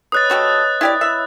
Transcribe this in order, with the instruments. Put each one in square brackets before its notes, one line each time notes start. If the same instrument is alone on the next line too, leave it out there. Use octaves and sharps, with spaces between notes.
[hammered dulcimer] B4 C#5 D#5 [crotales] D#6 F#6 A6
[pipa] A3 F#4 G4
E4 G4 D5
[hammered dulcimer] E4 [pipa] E5